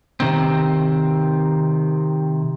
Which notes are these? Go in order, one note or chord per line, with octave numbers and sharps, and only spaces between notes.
C3 D#3 C4